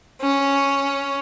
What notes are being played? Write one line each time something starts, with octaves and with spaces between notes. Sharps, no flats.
C#4